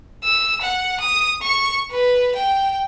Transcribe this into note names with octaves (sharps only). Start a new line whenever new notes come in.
E6
F#5
D#6
C#6
B4
G5